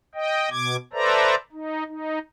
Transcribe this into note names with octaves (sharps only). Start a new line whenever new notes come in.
D#5 G5
B2 D6 G#6
A4 B4 C5 D5 E5 A#5
D#4
D#4